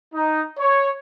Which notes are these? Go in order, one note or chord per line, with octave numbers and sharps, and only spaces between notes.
D#4
C#5